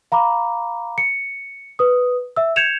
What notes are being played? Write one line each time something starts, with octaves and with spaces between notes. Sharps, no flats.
F5 A#5 B5 D6
C#7
B4 D#6
E5 E6
G6 G#6 C#7 E7 F7